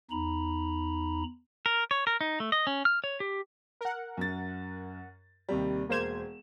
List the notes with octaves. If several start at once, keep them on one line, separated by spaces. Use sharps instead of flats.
E2 D#4 A#5 B5
A#4
C#5
A#4
D#4
A3
D#5
C#4
F6
C#5
G4
A#4 F#5
F#2 A6
D#2 C3 G3
E1 A#3 C5 G#6 E7